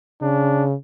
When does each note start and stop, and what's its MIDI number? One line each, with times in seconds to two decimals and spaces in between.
0.22 0.74 49
0.22 0.65 62